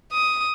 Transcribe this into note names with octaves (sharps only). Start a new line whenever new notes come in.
D#6